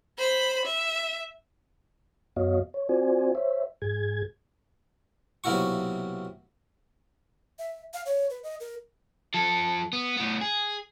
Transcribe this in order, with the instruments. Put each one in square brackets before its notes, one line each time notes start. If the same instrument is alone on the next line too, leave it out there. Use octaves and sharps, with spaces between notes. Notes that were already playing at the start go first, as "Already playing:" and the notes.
[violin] C5 B5
E5
[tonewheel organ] F#2 B3 F#4 C#5 D#5 F5
C#5
C4 F4 F#4 C5 D5 G#5
C5 C#5 E5
G#2 G#4 G#6
[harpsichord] B1 C3 A#3 E4 F#4 C#6
[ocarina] E5
F5
C#5
B4
D#5
A#4
[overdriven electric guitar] F3 A4
B3
A2 B3
G#4